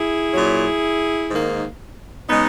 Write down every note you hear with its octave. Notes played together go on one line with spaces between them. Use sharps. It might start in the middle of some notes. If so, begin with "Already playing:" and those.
Already playing: E4 G#4
A#2 F#3 C#4
G#2 D#3 A#3
C#3 G#3 B3 D#4